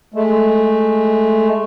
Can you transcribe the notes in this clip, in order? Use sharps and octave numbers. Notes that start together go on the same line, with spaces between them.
G#3 A3